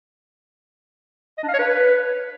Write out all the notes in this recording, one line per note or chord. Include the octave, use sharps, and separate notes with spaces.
D#5
D4
F5
C#5
B4